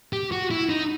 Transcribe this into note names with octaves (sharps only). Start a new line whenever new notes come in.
G4
F#4
E4
D#4